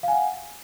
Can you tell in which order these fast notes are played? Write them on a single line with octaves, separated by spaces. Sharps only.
F5 G#5 F#5